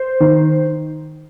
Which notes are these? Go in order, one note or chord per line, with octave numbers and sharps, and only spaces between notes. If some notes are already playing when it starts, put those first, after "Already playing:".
Already playing: C5
D#3